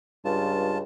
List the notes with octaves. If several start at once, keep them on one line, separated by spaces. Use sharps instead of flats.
C#2 G2 F4 A5